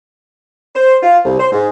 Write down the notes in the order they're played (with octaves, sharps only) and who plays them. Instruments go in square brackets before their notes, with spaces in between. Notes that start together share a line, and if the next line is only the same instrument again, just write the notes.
[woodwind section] C5
F4
C2
C5
G#2